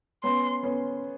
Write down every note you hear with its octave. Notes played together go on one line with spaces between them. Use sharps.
B3 C#4 C6
B3 C#4